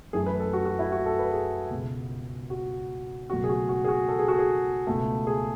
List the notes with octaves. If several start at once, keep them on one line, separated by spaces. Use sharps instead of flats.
F#2 E3 A3 G#4
B4
A4
F#4
F#4
E4
F#4
A4
B4
G#4
C#2 B2 G#3
F#4
C#2 B2 F#3 A3 F#4
G#4
F#4
F#4
G#4
F#4
A4
G#4
F#4
G#4
C#2 B2 A3
G#4